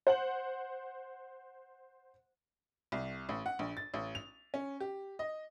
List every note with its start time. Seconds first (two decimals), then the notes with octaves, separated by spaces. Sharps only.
0.07 C5 F#5 F#7
2.92 C2
3.29 A1
3.46 F#5
3.59 A#1
3.77 A6
3.94 A1
4.15 F7
4.54 C#4
4.80 G4
5.19 D#5